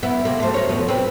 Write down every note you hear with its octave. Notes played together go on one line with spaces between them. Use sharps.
B3 E4
C3 A#3
A3 C4
A#4 C#5
F2 B2 B3
C4 B4